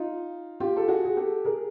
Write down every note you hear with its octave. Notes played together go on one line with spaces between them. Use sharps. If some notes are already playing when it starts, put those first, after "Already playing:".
Already playing: D#4 F4
F4 G4
A4
F#4 G#4
G#4
G4 A4
G#4 A#4